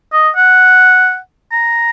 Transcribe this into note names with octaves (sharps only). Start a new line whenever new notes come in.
D#5
F#5
A#5